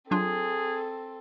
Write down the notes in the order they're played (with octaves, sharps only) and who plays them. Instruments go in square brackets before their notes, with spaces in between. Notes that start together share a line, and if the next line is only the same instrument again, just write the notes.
[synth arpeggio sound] F#3 D4 F4 [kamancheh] C4 A4 [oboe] G#4